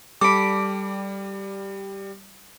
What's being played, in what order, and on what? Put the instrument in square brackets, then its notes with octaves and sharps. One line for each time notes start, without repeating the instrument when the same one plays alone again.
[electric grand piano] G3 [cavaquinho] A4 B5 [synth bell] D6 D7